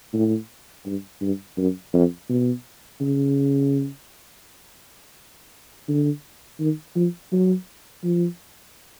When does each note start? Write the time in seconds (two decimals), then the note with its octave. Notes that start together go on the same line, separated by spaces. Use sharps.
0.14 A2
0.86 G2
1.21 G2
1.58 F#2
1.94 F2
2.29 B2
3.01 C#3
5.89 D3
6.60 D#3
6.96 F3
7.32 F#3
8.04 F3